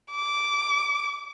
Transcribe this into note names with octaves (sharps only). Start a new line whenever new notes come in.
D6